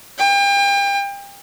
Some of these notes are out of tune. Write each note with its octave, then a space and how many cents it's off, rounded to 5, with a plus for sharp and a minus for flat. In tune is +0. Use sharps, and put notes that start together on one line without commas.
G5 +35